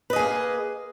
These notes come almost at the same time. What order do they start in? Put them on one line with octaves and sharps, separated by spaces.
B4 D#5 G#4 A#3